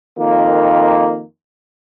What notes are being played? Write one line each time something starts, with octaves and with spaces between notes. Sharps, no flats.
F2 D#3 A#3